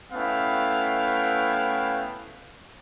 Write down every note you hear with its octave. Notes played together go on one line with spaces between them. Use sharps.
A3 B3 C#4 E4 F5 G5